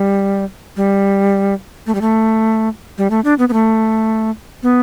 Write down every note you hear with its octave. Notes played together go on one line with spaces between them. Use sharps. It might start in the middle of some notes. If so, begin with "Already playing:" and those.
Already playing: G3
G3
A3
G3
A3
G3
A3
D4
B3
B3
A3
B3